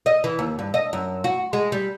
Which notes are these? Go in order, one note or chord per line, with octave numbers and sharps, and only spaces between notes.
D#5
E3
D#2
G2
D#5
F#2
F#4
G#3
G3